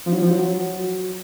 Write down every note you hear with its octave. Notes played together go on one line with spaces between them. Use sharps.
F3
F#3
F3
F#3